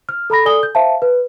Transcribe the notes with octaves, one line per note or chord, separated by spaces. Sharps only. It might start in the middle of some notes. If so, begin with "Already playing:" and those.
F6
A4 A#5 B5 A#6
A4 D5 G#5 D#6 G7
G6
C5 E5 F5 A5
B4